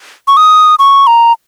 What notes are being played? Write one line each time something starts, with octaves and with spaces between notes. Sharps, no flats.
C#6
D#6
C#6
A#5